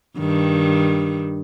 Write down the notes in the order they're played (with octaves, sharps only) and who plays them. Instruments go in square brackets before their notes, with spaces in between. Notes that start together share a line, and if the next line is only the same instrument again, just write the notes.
[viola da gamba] G2 D#3